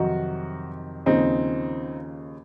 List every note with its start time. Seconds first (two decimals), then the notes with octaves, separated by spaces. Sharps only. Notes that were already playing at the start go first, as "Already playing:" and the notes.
Already playing: F2 C3 D#3 F#3 D#4 F#4
1.06 D#2 C#3 F3 C4 D#4